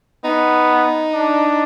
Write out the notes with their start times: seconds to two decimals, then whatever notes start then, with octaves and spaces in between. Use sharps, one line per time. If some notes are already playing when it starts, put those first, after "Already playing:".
0.24 B3 D#4
1.14 D4